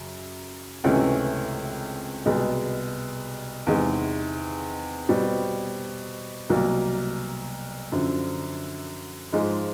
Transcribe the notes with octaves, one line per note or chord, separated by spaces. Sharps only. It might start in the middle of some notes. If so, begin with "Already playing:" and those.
Already playing: F#2 C#3
C#2 C3 E3 A3 C#4
C2 B2 G#3 B3
E2 C3 D#3 G#3
B2 G3 C4
C2 B2 F#3 A#3
F#2 D3 F3
G#2 F3 G#3